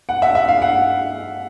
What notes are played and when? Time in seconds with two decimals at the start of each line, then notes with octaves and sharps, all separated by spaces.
0.09 F#5
0.22 E5
0.35 E5
0.48 F5
0.62 F#5